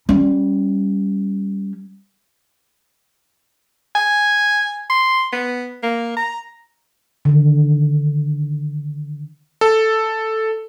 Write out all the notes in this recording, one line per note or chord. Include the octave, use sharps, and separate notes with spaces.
G3 C#4
G#5
C6
B3
A#3
A#5
D3 D#3
A4